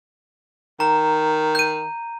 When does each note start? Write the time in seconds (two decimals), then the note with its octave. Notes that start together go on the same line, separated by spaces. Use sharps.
0.80 D#3 A#5
1.55 G6 D#7